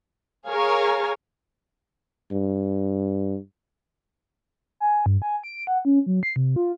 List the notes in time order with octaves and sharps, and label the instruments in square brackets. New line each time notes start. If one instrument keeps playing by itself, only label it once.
[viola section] G#4 A#4 C#5 F5 G#5 A#5
[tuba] G2
[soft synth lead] G#5
G2
G#5
D7
F#5
C#4
F#3
C7
C3
F4